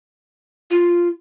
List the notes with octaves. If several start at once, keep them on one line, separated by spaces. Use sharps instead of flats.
F4